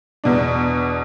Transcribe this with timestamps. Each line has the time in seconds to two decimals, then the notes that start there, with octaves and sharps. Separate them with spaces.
0.24 E2 B2 D4